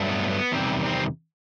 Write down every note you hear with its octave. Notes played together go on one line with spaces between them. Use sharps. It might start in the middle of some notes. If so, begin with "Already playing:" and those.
Already playing: G2 F#3 A3
B3
B3
E2 C3 D#3 G3 C4
C4